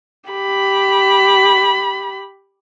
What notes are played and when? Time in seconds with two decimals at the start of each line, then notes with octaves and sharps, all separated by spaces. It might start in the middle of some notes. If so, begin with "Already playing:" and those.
0.30 G4 B5